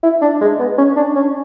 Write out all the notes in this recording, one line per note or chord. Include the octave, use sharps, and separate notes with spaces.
E4
D4
G#3
B3
C#4
D4
C#4